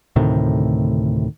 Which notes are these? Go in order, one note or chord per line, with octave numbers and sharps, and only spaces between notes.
D2 A2 C3 D#3